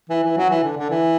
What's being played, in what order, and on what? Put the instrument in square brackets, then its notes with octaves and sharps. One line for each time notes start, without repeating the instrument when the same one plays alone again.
[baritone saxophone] E3
E3
F#3
E3
D3
D3
E3